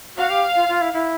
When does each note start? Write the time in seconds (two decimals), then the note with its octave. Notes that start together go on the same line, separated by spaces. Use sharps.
0.17 F#4 F5
0.30 G4
0.56 F4
0.68 F4
0.81 E4
0.93 E4